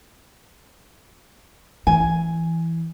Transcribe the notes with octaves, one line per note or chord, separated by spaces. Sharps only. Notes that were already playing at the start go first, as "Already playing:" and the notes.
E3 G#5